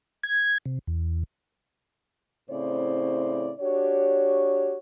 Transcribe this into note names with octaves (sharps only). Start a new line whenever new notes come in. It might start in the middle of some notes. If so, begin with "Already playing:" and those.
G#6
C3
E2
A2 C#3 C4 E4 C5 D5
D4 F#4 G4 C#5